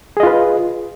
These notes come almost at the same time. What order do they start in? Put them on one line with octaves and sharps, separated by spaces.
G#4 D#5 F4 B4